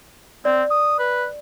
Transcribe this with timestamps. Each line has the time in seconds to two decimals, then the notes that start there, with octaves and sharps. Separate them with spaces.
0.45 C4 D5
0.70 D#6
0.99 B4